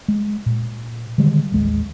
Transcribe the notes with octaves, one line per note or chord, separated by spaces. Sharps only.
G#3
A#2
D3 D#3 G3 G#3
A1 D#2 G#3